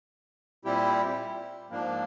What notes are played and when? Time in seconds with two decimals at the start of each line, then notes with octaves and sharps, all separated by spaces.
0.65 A#2 G3 C4 E4 G4
1.70 G#2 F3 A#3 D4